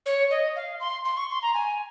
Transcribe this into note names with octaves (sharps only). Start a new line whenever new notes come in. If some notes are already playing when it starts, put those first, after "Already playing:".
C#5
D#5
F5
C6
C6
C#6
C6
A#5
G#5